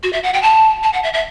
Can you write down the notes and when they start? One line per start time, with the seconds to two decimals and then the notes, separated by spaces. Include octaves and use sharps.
0.03 F#4
0.13 E5
0.23 F#5
0.34 G5
0.43 A5
0.83 A5
0.93 F#5
1.03 E5
1.14 E5